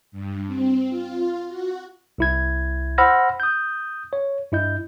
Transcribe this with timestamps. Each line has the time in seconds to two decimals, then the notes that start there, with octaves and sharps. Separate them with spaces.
0.12 G2
0.47 C4
0.90 F4
1.48 F#4
2.18 C2 E4 G#6
2.98 C5 F#5 B5 E6 F6 A#6
3.40 D#6 G6
4.13 C#5
4.52 G2 E4 D#5 G6